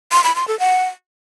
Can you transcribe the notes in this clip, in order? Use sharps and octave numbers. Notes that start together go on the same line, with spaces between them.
C6
B5
C6
A4
F#5